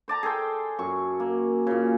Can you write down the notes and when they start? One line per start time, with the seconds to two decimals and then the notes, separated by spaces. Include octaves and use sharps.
0.08 C5 D5 A5 A#5
0.23 G#4 A4 C5 G5
0.79 F#2 C#6
1.20 A#3
1.67 A#2 C#3